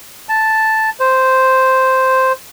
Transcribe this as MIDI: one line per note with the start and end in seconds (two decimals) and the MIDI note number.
0.29 0.90 81
1.00 2.33 72